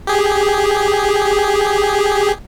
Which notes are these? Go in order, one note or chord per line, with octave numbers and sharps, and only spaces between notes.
G4 G#4